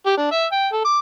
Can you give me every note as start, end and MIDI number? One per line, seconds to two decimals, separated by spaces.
0.06 0.16 67
0.17 0.27 62
0.32 0.45 76
0.52 0.67 79
0.73 0.85 69
0.85 0.99 86